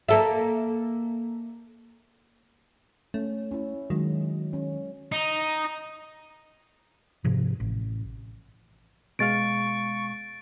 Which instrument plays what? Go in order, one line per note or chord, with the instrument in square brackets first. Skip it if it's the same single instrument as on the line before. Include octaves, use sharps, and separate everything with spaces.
[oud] A#3 A4 E5
[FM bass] A3 [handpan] C#4
[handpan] C#4 E4
[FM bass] D#3 [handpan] F#3 G#3
[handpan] C#4
[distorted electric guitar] D#4
[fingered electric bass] G#2 C3 F3
A1
[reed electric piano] B2 G#3 F5 [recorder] C#6 [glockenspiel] A6 D7